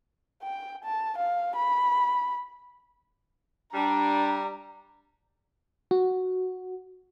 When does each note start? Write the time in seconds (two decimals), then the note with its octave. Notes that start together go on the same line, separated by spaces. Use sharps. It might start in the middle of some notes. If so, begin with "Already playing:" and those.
0.43 G5
0.84 A5
1.18 F5
1.55 B5
3.74 G3 D4 A#5
5.91 F#4